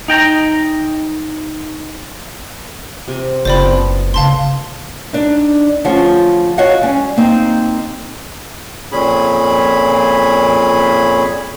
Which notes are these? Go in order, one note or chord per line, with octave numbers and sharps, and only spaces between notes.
D#4 G5 A#5
C3
F#1 F3 C4 C5 D5 B5
B3
A2 C#3 F5 A5 C6
D4 D#4
D2 F3 C#4 F4 G#4 F#5
F#4 C#5 D#5 F5 F#5
G3 C#4
A#3 C4 D#4
F2 A#2 C#4 G#4 B5